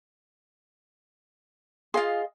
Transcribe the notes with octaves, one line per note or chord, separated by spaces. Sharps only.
F4 G#4 D#5 F5 C6